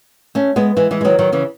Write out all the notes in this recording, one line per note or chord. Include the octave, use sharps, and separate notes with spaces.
A3 C#4
G#3 B3
E3 G#3
E3 G#3
G#3
D#3 F#3
D#3 F#3
C#3 E3